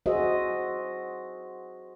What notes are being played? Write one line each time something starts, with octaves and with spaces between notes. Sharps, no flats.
F#4 G#4 C5 D#5 E5